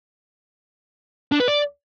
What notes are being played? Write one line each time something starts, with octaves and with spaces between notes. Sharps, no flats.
D4
B4
D5